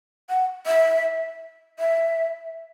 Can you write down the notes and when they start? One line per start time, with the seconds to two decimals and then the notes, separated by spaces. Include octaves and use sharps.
0.30 F#5
0.67 E5
1.79 E5